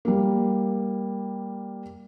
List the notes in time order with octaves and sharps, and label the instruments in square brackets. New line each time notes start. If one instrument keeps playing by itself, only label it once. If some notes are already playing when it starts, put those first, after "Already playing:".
[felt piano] G3 A#3